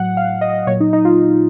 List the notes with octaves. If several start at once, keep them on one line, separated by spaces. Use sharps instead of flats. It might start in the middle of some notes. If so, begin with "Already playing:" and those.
Already playing: A2 F#3 F#5
F5
D#5
A#2 F#3 C#5
D#4
D#4
F4